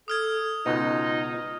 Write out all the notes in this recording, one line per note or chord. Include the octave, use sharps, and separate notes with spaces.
A4 D#6 F6 G#6
C#2 B2 D#4 F4